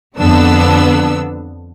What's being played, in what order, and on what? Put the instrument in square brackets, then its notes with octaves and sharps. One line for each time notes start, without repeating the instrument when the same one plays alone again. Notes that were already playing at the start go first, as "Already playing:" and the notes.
[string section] F2 D3 B3 D4 E6